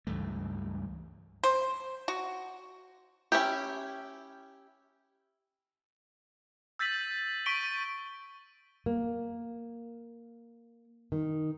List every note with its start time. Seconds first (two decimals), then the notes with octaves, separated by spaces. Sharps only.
0.07 C#2 G2 E3 A3
1.44 C5
2.08 F#4
3.32 C#4 E4 G4
6.79 E6 G6 A6 B6 D#7 F#7
7.46 C#6 B6 D7 D#7 G7
8.86 A#3
11.12 D#3